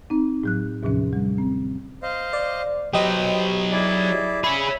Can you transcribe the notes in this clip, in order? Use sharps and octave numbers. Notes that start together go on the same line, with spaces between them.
C4 D#4
A2 F#3 F#6
D#2 A2 C3 F3 C#4
G3
C4
C5 D#5 F5
D5
F#3 G4 B4 C5 D#5 G6
E4 G#4 D5
G#4 C#5 E5 B5